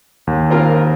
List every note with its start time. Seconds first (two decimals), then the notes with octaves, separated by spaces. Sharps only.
0.27 D#2
0.51 C4 F4 A#4